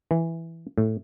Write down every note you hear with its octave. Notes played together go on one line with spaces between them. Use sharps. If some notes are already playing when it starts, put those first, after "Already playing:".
E3
A2